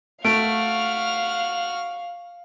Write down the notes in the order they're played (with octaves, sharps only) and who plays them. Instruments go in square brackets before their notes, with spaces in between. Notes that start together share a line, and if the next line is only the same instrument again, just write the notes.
[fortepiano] A3 [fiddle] F#4 F6 [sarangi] F5 [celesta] D7